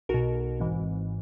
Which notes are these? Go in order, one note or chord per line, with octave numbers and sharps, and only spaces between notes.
B1 B2 F#4 A#4
G#1 G#2 E3